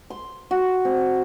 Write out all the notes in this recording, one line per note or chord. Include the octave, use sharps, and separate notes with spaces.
C6
F#4
C4